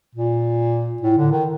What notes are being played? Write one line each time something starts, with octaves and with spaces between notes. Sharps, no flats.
A#2
A2
D3
D#3